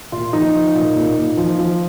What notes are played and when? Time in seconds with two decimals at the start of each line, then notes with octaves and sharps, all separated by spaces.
0.12 A#2 F4
0.33 F3 D#4
0.55 F3
0.75 A#2
0.96 A#2
1.18 A#2
1.37 F3
1.59 F3